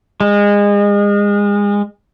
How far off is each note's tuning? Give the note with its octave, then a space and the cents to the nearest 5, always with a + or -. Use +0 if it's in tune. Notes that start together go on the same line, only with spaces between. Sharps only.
G#3 -30